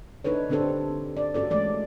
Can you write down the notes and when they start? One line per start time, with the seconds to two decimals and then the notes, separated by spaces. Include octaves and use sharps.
0.24 D4 D#4 A4 B4 C#5
0.50 D3 C4 D4 G4 A4 C5
1.17 D5
1.34 C#4 F#4 A4 D5
1.50 E3 G#3 A3 D5